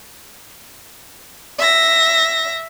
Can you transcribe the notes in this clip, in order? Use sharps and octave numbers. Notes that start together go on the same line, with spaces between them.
E5 A#6